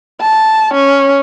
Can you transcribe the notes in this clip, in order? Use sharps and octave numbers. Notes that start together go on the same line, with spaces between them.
A5
C#4